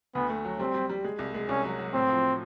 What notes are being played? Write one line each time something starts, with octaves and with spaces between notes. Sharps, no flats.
D2 B3
A3
F#3
G3 C4
G3
G3
G#3
C2
G#3
C2 C#4
F#3
F#3
A2 C4
F3